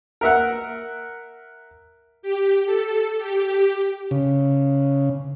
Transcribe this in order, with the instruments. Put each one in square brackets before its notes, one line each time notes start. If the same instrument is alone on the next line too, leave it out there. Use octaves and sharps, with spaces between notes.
[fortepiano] A#4 E5 F#5
[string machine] G4
A4
G4
[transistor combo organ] C#3